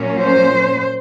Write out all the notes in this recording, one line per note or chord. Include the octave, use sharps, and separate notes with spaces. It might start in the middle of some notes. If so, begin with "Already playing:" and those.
Already playing: A#2 F#3 A#3 C#4
C5